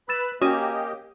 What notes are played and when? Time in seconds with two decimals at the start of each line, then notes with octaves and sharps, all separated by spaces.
0.09 B4 B5 E6 A6 E7
0.42 A#3 C#4 F#4 G4 D#5 D#6 D#7